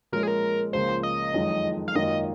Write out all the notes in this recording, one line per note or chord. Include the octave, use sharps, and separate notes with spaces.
A#2 F3 G#3 C#4 A#4
G#4
A#4
C#2 C#3 F3 A#3 C5
D#5
F#1 F2 D#3 G#3
F5
G#1 F#2 D#3 A#3 F4 D#5